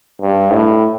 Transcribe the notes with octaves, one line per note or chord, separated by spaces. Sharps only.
G2
A2